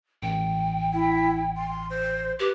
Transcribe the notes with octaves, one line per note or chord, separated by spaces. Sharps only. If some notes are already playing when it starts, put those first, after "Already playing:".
A1 G5
E4
C6
C5
G4 B4